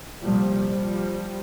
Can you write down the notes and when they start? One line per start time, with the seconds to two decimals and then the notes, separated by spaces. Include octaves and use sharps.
0.22 C2 A#2 F3 G3
0.68 F3 G3